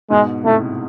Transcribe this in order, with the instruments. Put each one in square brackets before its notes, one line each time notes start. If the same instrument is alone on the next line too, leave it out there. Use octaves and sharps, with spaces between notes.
[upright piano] G#2 B2 [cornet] G#3
[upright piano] A2 C3 [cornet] A3